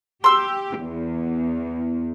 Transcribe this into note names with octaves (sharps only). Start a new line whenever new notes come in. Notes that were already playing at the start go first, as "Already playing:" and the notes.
G4 C6 E6
E2